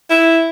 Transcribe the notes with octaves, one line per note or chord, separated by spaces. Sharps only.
E4